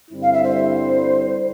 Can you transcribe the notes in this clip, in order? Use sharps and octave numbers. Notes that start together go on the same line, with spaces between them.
G2 D3 G3 C4 E4
F5
E5
C5